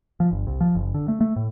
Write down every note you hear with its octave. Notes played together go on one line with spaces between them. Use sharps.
F3
G1
C2
F3
F#1
D3
A3
A3
A2